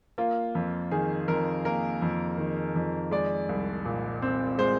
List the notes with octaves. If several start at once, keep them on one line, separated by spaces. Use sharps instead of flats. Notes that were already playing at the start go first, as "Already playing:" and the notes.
A#3 F4
F2
D#3 G#4
F2 A#4
A#3 A#4
F2
D#3
F2
G#3 D5
C2
A#2
C4
G#3 C5